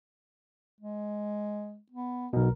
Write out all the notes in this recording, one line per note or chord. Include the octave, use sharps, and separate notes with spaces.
G#3
B3
B1 B2 A#4